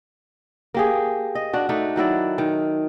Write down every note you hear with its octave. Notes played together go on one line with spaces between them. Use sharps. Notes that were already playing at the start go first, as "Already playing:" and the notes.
A#3 G4 G#4
D#5
D4 F#4
A3 D4 D#4
D#3 F#3 E4 D5
D#3